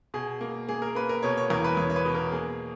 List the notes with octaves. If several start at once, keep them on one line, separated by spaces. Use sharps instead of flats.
B2 G#4
A#3
A#3 G#4
A#4
A#3 B4
A#4
B2 C#5
C#5
E2 A#4
B4
E2 C#5
C#5
B4
B2
A#4
A#3 G#4